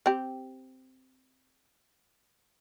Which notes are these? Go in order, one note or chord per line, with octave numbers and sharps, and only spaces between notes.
C4 G4